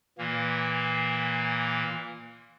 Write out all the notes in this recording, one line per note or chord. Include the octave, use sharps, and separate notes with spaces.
A#2 E3 A#3